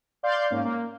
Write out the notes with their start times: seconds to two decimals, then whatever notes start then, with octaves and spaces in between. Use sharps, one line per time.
0.23 D5 F5 C6 G6
0.51 G#2 A#3 C#4
0.65 A#3